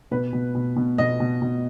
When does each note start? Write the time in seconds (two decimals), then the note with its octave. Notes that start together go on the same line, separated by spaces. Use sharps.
0.11 B2 B4
0.33 B2
0.55 B2
0.76 B2
0.98 B2 D#5
1.20 B2
1.42 B2